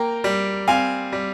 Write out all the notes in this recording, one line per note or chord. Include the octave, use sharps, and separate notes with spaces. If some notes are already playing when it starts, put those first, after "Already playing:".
Already playing: A#3 G5 A#5
G3
C4 F5 G#5
G3